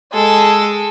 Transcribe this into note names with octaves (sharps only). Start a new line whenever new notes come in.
G#3 A4